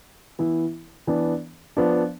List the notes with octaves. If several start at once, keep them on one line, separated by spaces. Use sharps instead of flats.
E3 B3 E4
E3 B3 D4
F3 B3 D4